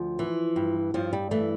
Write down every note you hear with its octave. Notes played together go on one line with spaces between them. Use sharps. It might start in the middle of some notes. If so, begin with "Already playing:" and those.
Already playing: D2 F3
E3
G2
G2 F3
G3
E3 A3